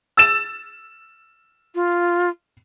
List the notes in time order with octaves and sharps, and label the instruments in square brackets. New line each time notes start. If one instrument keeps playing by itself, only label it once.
[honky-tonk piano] E6 A6 E7
[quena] F4